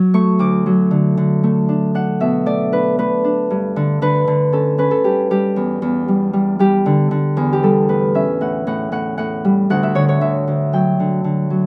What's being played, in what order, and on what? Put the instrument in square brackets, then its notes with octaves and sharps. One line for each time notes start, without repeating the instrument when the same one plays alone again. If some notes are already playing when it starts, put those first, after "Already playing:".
Already playing: [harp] F#3
A3 C#6
D2 D6
F#3
D3
D3
A3
D4
D4 F#5
B2 E5
A3 D5
D4 B4
A3 B4
D4
G2
D3
D3 B4
D3
C#4 A4
C#4 B4
A4
G2 G4
G3 G4
E2
E2
G3
G3
G3 G4
D3
D3
E2
G4
G3 A4
A2 B4
C#4 E5
A2 F#5
A2 F#5
A2 F#5
A2 F#5
G3
D2 F#5
E5
D3 C#5
C#5
D2 E5
D2
F#3 G5
D3
D3
F#3